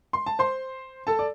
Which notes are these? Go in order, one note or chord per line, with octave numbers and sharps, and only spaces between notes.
C6
A5
C5 C6
A4 A5
D5